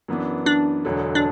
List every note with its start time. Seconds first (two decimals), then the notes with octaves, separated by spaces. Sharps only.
0.08 F#2 E3 B3 D4
0.46 D4
0.85 E1 E2 D3 F#3
1.15 D4